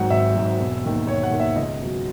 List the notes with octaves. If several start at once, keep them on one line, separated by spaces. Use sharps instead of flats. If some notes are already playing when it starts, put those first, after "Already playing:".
Already playing: G#1 G#2 F#3 F#5
G#1 E5
G#2 F#3
E1
D#2 D#3
E1 C#5
F#5
D#2 D#3
E5
C#2 D#5
B2 F#3